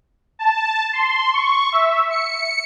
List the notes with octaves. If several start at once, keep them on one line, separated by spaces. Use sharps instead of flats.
A5
C6
C#6
E5
C#7